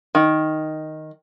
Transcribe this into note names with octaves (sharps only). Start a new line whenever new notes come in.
D#3